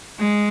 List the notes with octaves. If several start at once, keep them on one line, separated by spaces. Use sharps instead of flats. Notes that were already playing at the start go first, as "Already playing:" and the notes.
G#3